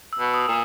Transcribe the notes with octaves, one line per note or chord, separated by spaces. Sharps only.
E6
B2
D#6
A#2